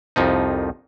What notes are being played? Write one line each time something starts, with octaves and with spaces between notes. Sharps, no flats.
C2 F2 F3 D#4